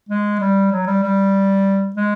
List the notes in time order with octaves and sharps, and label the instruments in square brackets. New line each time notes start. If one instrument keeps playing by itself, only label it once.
[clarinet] G#3
G3
F#3
G3
G3
G#3